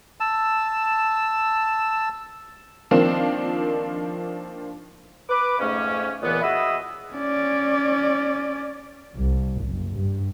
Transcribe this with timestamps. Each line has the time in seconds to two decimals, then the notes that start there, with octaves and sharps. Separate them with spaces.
0.20 A5 E6
2.91 D#3 F3 A#3 C4 D4
5.30 B4 D6
5.59 F2 G#2 A3 C#4
6.22 C#2 A#2 E3 B3
6.42 E4 F#4 G#4 D#5 B5 E6
7.14 C#4 D5
9.16 C2
9.64 F#1
9.98 G2